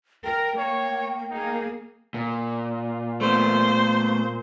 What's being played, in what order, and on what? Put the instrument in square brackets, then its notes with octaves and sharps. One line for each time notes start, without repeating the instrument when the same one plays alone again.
[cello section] A#4 [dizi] G5
[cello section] A#3 [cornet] C#5
[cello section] A#3 G#4 [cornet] D#4
[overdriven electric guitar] A#2
[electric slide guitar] A3 B3 [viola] C5